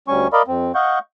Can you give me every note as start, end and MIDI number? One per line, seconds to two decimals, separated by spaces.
0.08 0.27 38
0.08 0.27 55
0.08 0.27 61
0.08 0.27 80
0.08 0.27 85
0.33 0.42 70
0.33 0.42 74
0.33 0.42 75
0.33 0.42 77
0.33 0.42 83
0.48 0.72 41
0.48 0.72 60
0.75 0.99 75
0.75 0.99 77
0.75 0.99 78
0.75 0.99 85
0.75 0.99 91